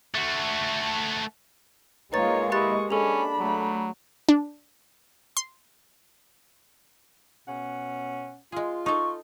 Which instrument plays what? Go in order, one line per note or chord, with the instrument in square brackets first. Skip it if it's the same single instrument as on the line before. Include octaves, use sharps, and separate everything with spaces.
[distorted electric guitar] A3 F#4
[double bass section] G#3 A#3 [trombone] D#4 [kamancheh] F4 C#5 [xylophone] B4 A6
[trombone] E4 [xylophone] G4 F#6 A6 [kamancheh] D#5 C#6
[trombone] C#4 [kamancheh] D4 B5 [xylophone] G#4 A4
[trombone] F#3 [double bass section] A3
[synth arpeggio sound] D4
C6
[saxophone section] B2 C#4 F#5
[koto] G#3 G#4 [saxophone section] F4
[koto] D#4 A4 [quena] C#6